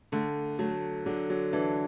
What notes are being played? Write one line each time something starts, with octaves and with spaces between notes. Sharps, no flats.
D3 A3
F#3 A3
D3 F#3
F#3
E3 D4